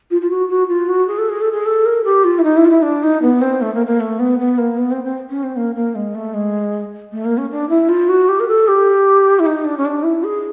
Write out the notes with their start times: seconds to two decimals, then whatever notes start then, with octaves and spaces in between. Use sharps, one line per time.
0.11 F4
0.21 F4
0.30 F#4
0.49 F#4
0.68 F4
0.89 F#4
1.08 G#4
1.18 A4
1.29 G#4
1.41 A4
1.52 G#4
1.66 A4
1.86 A#4
2.04 G4
2.24 F4
2.39 E4
2.44 D#4
2.57 E4
2.65 F4
2.70 E4
2.82 D4
3.03 D#4
3.22 B3
3.41 C4
3.61 A3
3.74 A#3
3.87 A#3
4.00 A3
4.19 B3
4.39 B3
4.58 A#3
4.78 B3
4.91 C4
5.04 C4
5.30 C#4
5.43 C4
5.56 A#3
5.76 A#3
5.95 G#3
6.15 A3
6.34 G#3
7.12 A3
7.25 A#3
7.38 C#4
7.51 D4
7.69 E4
7.89 F4
8.09 F#4
8.29 G4
8.40 A#4
8.48 A4
8.68 G4
9.39 E4
9.46 D#4
9.65 D4
9.78 C#4
9.85 D4
10.03 E4
10.24 G#4